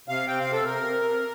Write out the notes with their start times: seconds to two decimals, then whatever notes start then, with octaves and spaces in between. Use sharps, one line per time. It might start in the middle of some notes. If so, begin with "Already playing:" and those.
0.08 C3 F5
0.27 C4 G5
0.40 F5
0.47 C3
0.52 A4
0.65 C3 A#4
0.85 C3
1.05 C3